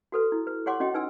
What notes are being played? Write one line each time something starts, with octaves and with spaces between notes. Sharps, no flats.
F#4 A4 B4
E4
B4
G4 C#5 F#5 C6 D6
C#4 F#4 D#5 G5
D#4 B4 G#5 E6